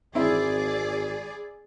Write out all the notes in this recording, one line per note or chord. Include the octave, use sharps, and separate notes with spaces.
G#1 C4 E4 G#4 D5